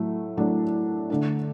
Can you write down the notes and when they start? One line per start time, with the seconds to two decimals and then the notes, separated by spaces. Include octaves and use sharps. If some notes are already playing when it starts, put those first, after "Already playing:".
Already playing: A2 F#3 A3
0.37 A2 F#3 A3 D4
1.10 D3 A3 D4